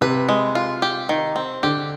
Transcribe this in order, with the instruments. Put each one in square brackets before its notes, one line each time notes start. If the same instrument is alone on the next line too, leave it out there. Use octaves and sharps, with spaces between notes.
[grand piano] C3 [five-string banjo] B4
[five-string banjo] G#3
F4
G4
D#3
C4
[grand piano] D3 [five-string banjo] G4